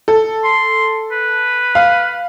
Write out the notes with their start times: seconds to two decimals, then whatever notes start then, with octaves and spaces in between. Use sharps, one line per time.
0.08 A4
0.44 C6
1.11 B4
1.75 F5